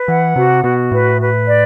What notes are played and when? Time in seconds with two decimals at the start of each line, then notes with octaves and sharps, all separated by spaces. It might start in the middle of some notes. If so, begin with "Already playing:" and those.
Already playing: B4
0.08 E3 F#5
0.36 C3 F#4
0.64 B2 F#4
0.92 A2 B4
1.20 B4
1.47 D5